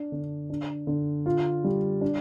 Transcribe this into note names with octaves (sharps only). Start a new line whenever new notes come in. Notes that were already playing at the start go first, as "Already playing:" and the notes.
Already playing: D4
D3
D4
D3
F4
G3
D4